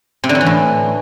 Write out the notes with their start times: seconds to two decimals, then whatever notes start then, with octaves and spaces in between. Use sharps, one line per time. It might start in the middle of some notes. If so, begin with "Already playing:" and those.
0.24 C3
0.29 D3
0.35 F#3
0.41 E3
0.46 A2